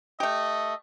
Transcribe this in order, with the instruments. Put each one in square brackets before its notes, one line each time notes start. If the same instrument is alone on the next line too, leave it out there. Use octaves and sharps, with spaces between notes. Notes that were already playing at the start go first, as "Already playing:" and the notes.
[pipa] A3 G4 [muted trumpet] D#5